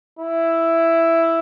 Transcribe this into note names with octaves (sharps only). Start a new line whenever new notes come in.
E4